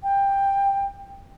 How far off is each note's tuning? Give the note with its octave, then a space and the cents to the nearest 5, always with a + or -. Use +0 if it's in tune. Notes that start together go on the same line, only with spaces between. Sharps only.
G5 +15